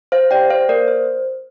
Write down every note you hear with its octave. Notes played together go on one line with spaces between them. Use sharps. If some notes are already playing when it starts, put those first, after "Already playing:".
C5 F5
G4 D5 G5
C5 F5
A#3 A#4 D5
C5